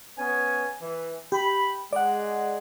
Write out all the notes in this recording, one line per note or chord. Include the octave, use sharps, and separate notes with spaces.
B3 C#4 G#5
E3
G4 B5
G#3 D5 F#5